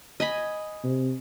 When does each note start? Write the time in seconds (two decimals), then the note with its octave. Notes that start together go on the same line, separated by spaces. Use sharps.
0.20 D#5 G#5 B5
0.84 C3